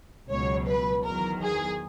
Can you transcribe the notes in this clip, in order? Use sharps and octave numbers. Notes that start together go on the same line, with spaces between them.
C#2 B2 F#3 C#5
B4
E2 D#3 F#3 A#4
G#4